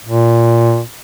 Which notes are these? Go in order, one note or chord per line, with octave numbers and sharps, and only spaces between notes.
A#2